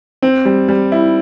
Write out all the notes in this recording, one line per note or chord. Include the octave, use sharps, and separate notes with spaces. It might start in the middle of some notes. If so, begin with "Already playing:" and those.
C4
G3
G3
E4